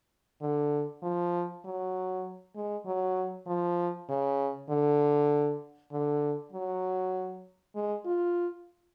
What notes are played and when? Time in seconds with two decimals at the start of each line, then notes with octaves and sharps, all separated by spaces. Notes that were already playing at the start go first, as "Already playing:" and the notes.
0.41 D3
1.03 F3
1.65 F#3
2.55 G#3
2.86 F#3
3.47 F3
4.09 C#3
4.70 D3
5.92 D3
6.52 F#3
7.75 G#3
8.05 F4